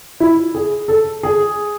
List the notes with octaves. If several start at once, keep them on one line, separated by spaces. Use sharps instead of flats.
E4
G#4
A4
G#4